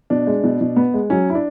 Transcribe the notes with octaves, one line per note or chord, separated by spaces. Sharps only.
B2 D4
G#3
B2
B2
B3
G#3
F#3 C#4
E4
D4